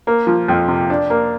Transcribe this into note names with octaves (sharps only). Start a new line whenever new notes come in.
A#3
F3
F2
C3
D4
A#3